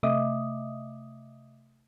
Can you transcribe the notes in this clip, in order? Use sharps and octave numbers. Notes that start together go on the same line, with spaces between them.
C3 A3 D#5 E5 D6 D#6